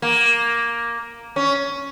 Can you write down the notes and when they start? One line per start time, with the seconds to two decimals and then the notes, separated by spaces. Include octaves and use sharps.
0.02 A#3
1.36 C#4